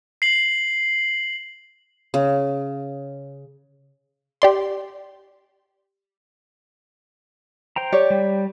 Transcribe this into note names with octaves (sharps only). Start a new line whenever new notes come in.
C7 F#7
C#3
G4 D5 C6
C5 G5 A#5
G4 C#5 D5
G3